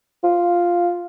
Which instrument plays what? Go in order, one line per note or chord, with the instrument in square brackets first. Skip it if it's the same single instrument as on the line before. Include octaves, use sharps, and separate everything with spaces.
[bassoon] F4